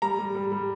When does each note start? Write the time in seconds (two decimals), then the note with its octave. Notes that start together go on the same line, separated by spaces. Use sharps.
0.02 G3 A#5
0.19 G3
0.35 G3
0.52 G3